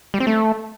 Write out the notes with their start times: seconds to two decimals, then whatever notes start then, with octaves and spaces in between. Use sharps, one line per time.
0.14 G3
0.20 C4
0.27 A3